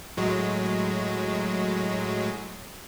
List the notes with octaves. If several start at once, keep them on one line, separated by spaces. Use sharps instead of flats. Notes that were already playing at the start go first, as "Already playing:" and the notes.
A2 F#3 G#3